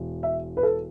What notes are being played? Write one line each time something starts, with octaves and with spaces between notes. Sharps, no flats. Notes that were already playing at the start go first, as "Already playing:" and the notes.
Already playing: E1
E5
B4
A4